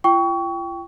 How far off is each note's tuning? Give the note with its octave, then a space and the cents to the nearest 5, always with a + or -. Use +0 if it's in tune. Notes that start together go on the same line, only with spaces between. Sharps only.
F4 -40 G5 +0 C#6 +25